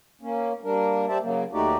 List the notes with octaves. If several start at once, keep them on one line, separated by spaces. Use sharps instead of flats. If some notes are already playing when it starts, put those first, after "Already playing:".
A#3 C#4
G3 A#3 D4 A#4
G3 G4 C5 D5 E5 A5
C#3 F#3 A#3
D#2 A3 D#4 F#4 G4 D5